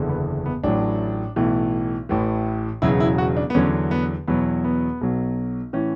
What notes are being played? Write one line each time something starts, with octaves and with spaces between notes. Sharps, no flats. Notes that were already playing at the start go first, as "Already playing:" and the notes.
Already playing: F#1 E2 D3
B3
B3
A1 A2 F#3 D4
B1 A2 E3
A1 A2 E3
E1 E2 C#3 F#3 E4
E4
F#4
D4
B3
E2 D3 F#3 C#4
B3
E2 B2 F#3 B3
B3
B1 B2 F#3
A2 E3 C#4